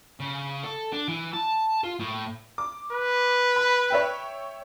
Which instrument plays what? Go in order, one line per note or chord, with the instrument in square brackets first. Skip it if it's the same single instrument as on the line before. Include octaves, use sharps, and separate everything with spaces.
[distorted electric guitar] C#3
A4
D4
E3
A5
F4
A2
[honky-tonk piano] D6
[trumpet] B4
[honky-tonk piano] B5
C#5 E5 G5